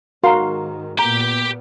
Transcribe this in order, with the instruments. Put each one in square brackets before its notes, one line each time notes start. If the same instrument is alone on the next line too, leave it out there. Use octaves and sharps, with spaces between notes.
[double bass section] G#2 D#3 [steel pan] F#4 A#4 C6 [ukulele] F5 A#5
[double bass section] A#2 B3 [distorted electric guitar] G4 G5 [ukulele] A#5